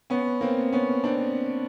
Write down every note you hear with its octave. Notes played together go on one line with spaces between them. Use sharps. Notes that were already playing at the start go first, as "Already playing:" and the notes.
B3 C#4
A#3 C4
B3 C#4
C4 D4